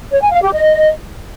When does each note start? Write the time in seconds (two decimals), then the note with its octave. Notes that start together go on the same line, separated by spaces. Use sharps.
0.12 C#5
0.22 G#5
0.32 F5
0.42 G4
0.53 D#5